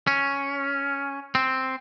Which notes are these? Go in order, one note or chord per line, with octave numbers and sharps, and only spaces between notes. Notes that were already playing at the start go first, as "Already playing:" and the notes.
C#4
C4